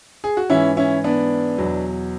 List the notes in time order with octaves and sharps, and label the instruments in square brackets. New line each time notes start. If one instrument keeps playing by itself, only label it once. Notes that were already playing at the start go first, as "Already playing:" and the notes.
[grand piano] G#4
F#4
G#2 E3 C#4 E4
C#4 E4
B3 D4
E2 B2 F#3